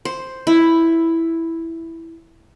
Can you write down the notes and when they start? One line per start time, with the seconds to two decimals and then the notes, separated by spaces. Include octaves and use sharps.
0.05 C5
0.47 E4